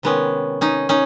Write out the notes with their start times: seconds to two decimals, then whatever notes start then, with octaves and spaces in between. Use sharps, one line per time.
0.03 C3 D#3 G#3 B3 C#4
0.61 C#4 D#4
0.89 C#4 D#4